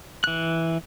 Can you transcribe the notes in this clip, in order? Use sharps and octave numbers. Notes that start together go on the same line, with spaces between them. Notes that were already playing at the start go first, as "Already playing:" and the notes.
E3 F#6